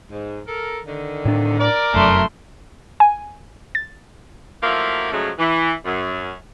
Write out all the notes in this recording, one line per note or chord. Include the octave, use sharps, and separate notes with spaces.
G#2
A4 A#4
D3 D#3
A2 D4
A#4 D5
F1 F#2 A3 C6
G#5
A6
F3 F#3 A3 A#3 E4 F4
G#2 C#3 F3 F#3 G#3 A3
E3
F#2